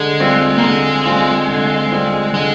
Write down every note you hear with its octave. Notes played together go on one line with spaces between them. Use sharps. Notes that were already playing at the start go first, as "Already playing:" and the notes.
Already playing: D3 G#3
G3 C4 F4
A#3
D3 G#3
G3 C4 F4
D3
G3 C4 F4
D3 G#3